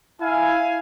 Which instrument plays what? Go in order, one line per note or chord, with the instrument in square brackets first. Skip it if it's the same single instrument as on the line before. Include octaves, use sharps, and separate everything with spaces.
[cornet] E4 [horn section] F5 G#5